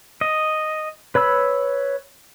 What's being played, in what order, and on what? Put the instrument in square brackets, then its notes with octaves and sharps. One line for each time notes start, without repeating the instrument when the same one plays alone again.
[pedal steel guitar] D#5
B4 C#5 B5 E6